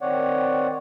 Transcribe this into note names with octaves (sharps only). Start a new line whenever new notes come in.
D#3 C4 C#5 D5 F#5